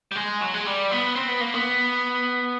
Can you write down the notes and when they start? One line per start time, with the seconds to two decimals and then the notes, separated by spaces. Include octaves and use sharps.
0.12 G3
0.16 G#3
0.41 F#3
0.54 G#3
0.66 G3
0.91 B3
1.15 C4
1.28 B3
1.41 A#3
1.54 B3